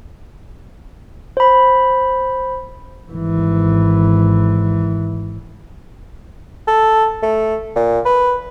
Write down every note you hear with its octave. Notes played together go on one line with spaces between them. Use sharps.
C5 B5
G#1 E3
A4
A3
A#2
B4